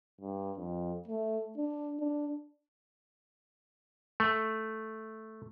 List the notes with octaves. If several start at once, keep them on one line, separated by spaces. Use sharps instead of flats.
G2
F2
A3
D4
D4
A3